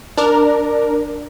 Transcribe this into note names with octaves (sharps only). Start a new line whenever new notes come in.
D4 A#4